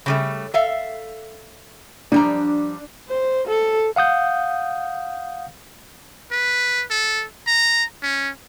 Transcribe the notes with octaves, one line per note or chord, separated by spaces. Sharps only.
C#3 G3 A3
A4 E5 F5
F3 G3 D4 A#5
C5
A4
F5 F#5 D#6 G6
B4
A4
A#5
C#4